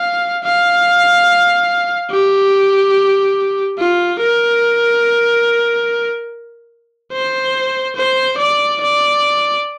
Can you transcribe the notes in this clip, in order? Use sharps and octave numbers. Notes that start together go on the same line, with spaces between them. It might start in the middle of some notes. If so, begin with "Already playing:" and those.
Already playing: F5
F5
G4
F4
A#4
C5
C5
D5
D5